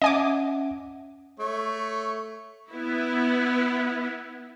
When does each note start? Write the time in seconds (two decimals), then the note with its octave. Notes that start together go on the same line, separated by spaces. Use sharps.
0.02 C#4 D#5 E5 F#5 G#5 D6
1.40 A3 C#5
2.72 B3 E4